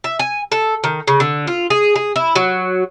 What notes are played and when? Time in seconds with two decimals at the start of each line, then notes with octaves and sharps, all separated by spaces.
0.04 E5
0.19 G#5
0.52 A4
0.84 D#3
1.07 C#3
1.20 D3
1.47 F4
1.70 G#4
1.96 G#4
2.16 E4
2.35 F#3